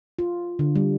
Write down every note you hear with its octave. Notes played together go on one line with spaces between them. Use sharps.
F4
D3
G3